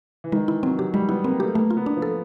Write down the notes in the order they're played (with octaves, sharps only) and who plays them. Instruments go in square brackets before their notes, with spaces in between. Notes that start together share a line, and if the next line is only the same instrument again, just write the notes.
[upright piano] E3
[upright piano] D#3 [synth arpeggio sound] G#3
[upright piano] E3 [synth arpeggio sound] E4
[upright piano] F#3 [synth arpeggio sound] C4
[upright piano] F#3 [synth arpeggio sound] G4
[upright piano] G3 [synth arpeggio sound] G#3
[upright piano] B3 [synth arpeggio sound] E4
[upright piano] A#3 [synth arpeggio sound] C4
[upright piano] A3 [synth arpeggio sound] G4
[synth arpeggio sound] A3 [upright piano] A#3
[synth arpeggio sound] F4
[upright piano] B3
[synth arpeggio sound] D4
[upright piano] F3
[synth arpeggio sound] A4